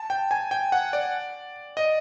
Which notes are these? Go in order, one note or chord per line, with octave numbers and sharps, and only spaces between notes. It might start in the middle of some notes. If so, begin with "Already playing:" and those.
Already playing: A5
G5
G#5
G5
F#5
D5
D#5